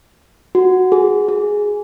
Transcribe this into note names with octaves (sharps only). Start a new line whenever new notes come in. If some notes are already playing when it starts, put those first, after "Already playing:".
F#4
G#4
G#4